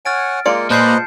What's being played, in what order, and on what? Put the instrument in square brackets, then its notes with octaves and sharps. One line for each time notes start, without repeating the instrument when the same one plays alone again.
[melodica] C#5 F#5 G#5 [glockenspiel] F6 A6 D7
[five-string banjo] G#3 F4 D5 [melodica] A#3 [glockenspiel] C#7
[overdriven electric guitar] A#2 [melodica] B4 C5 D#5 [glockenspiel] A5 G6 C7